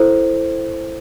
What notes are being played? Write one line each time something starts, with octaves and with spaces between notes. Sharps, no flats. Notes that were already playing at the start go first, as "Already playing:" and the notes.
Already playing: E4 A4 C5